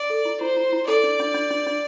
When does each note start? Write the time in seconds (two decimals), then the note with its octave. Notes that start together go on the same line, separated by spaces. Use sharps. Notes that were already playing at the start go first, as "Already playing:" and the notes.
Already playing: D5
0.10 A4
0.25 E4
0.41 E4 C5
0.57 E4
0.73 E4
0.87 A4 D5
1.03 D4
1.20 D4
1.34 D4
1.51 D4
1.67 D4